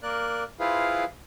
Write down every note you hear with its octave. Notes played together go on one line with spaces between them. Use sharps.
A#3 A#4 D5 F#6
E4 F4 G#4 B4 C5 F5